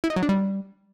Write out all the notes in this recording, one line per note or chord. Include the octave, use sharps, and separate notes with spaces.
E4
D#4
F#3
D4
G3